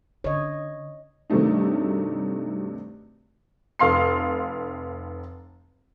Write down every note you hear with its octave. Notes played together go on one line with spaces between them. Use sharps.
D3 C#5 D#5
G2 C3 D#3 F#3 A3 D#4
F1 F5 C6 C7